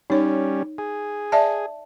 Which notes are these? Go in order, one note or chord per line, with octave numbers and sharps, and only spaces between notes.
G3 C#4 D#4 C#5
G#4
D5 E5 A5